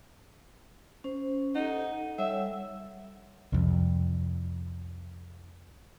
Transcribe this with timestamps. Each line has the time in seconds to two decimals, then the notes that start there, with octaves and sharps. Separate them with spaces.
1.04 C#4 C5
1.55 D#4 A4 F#5
2.18 G3 C#5 E5 F#5
3.52 C2 F2